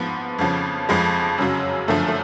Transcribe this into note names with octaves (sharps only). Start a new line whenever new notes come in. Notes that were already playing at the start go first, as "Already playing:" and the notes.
Already playing: G#2 F3 B3
F2 C#3 F3
F2 F3 G#3
F#2 C#3 F#3
F#2 D3 F3 A3
A3